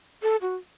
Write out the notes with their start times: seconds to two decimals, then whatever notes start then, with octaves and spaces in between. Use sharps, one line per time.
0.23 A4
0.42 F#4